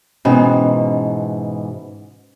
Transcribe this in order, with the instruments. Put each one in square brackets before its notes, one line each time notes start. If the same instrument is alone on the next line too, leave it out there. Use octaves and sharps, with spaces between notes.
[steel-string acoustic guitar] G#2 B2 E3 [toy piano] C#4 F#4 B5